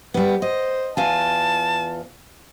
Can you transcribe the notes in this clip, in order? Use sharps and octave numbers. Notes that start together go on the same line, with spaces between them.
G3 B3 B4
C5 D#5
E2 F4 G#5 A5